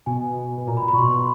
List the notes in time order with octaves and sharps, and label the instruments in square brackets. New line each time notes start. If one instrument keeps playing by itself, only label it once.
[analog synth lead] B2 [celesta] G#5
[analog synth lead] B2
[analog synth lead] A#2 [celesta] A#5
[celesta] B5
[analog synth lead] A#2
[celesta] B5
[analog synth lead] A#2 [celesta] C#6
[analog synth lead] B2 [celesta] C6
[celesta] C6